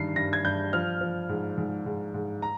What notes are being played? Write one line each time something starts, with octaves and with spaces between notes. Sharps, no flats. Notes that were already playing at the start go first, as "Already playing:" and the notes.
Already playing: G2 D#3 C7
G2 A#6
G#6
G2 G6
F3 F6
F3
G#2
G#2
G#2
G#2
A#5